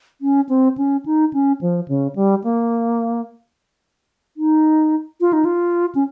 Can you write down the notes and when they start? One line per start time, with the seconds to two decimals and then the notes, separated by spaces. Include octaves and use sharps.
0.21 C#4
0.49 C4
0.78 C#4
1.06 D#4
1.33 C#4
1.61 F3
1.88 C#3
2.16 G3
2.44 A#3
4.37 D#4
5.21 F4
5.33 D#4
5.45 F4
5.95 C#4